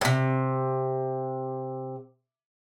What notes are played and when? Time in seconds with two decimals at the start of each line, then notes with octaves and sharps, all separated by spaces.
0.01 A2 C3